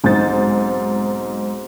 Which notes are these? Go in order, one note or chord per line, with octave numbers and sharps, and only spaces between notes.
B1 G#2 C4 D#4 G6 A6